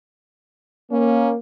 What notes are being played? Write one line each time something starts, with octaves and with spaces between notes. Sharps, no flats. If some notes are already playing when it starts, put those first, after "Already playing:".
A#3 C#4